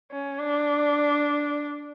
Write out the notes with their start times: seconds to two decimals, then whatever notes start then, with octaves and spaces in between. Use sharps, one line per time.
0.12 C#4
0.39 D4